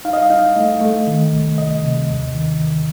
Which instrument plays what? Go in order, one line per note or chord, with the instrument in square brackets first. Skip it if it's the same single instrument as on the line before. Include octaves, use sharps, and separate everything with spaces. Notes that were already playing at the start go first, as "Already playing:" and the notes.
[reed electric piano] D#4 F5
D#5
F5
D#4
A3 D#5
A3
D#3
C2
C2 D#5
C3
D#2
D#3
D#3